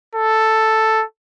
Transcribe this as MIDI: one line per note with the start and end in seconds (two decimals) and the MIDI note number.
0.15 1.04 69